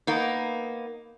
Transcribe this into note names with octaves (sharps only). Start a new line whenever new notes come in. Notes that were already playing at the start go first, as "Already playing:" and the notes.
A#3 B3 D#4